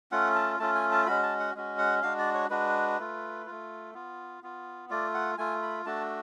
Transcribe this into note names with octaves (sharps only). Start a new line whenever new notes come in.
A3 C#4 F4 F#5
A5
A3 C#4 F4 A5
G#5
A5
G#3 C#4 F#4 B5
A5
F#5
G#3 C#4 F#4
F#5
G#3 D4 F#4 F5
D5
C#5
G#3 D4 F#4 B4
A3 F4
A3 F4
B3 F4
B3 F4
A3 F4 D5
F#5
A3 F4 G#5
B5
A3 D4 F#4 A5